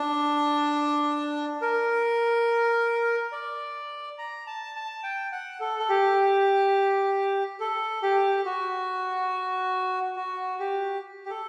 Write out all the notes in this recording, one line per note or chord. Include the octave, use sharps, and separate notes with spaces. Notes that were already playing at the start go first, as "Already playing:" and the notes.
Already playing: D4
A#4
D5
A#5
A5
A5
G5
F#5
A4
A4
G4
A4
G4
F#4
F#4
G4
G4
A4